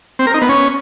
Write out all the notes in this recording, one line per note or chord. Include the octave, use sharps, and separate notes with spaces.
C4
A#4
D#4
B3
C#4